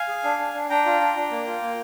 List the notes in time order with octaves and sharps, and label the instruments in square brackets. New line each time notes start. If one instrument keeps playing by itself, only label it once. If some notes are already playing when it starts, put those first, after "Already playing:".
Already playing: [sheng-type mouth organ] F5 G#5
G#4
D4
D4
D4
D4 G5 A#5
F4
D4
D4
A#3
F4
A#3